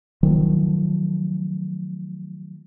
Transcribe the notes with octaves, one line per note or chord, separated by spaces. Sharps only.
D#3 F3 F#3 A3